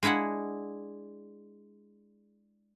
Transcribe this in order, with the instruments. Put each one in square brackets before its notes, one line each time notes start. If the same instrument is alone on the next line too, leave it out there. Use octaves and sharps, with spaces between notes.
[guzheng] G#3 D4 E4 G#4 F#5